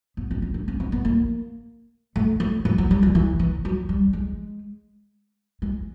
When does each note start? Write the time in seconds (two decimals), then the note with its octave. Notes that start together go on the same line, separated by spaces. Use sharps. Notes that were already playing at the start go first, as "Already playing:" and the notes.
0.17 B3
0.31 C4
0.42 C#4
0.54 D4
0.68 C#4
0.80 C4
0.92 B3
1.05 A#3
2.16 A3
2.40 A3
2.65 F3
2.78 F#3
2.91 G3
3.03 F3
3.15 E3
3.39 E3
3.65 F#3
3.89 G3
4.13 G#3
5.62 G#3